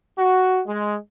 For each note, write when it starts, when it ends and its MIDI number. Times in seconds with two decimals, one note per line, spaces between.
0.17 0.61 66
0.66 0.96 56